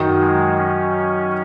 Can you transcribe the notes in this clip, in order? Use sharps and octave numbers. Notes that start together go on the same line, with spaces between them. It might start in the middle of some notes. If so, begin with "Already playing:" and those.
Already playing: F#2 D#3 F#3 D#4
G#3
C#4